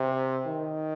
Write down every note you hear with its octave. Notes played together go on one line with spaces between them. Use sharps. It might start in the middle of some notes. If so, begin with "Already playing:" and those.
Already playing: C3
D#3